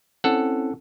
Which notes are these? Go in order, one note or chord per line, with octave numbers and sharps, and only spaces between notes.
C4 C#4 E4 A4 F#5